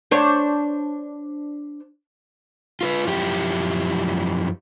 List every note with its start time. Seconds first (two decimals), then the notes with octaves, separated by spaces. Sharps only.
0.11 D4 C5 C#5
2.81 F4 A#4 B4
3.07 F#2 F3 E4 G4